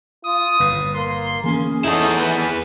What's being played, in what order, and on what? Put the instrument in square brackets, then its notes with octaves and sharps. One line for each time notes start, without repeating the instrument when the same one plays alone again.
[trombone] F4 [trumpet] D#6
[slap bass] G1 A#2 [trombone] B4
[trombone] A#3 [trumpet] C6
[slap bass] E3 A#3 C#4 [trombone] G#4
[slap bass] E2 [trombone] A2 [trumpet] D#4 [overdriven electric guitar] E4 G#4
[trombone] E3 [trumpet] B4